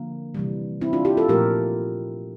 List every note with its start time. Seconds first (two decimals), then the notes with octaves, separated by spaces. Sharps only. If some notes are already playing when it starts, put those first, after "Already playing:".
Already playing: D3 F3 A#3
0.34 C3 E3 G3
0.81 C4 E4
0.93 D4 F4
1.05 E4 G4
1.17 F4 A4
1.29 A#2 F3 A3 G4 A#4